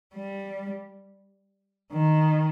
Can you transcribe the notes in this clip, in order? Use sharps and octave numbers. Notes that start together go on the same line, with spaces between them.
G3
D#3